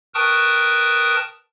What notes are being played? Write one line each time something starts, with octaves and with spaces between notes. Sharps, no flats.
A#4 B4 G5 A5 C#6 D#6